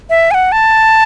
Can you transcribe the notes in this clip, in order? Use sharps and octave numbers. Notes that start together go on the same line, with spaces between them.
E5
G#5
F#5
A5